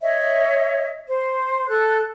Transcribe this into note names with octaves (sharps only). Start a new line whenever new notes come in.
C#5 D#5 E5
C5
A4 F#6